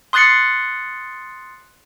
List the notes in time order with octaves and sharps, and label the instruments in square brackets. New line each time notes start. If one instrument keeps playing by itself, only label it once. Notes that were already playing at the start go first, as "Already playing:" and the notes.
[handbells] C6 D#6 F#6 A6 C7 C#7